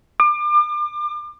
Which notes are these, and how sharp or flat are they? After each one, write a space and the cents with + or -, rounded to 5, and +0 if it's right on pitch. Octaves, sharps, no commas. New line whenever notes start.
D6 +35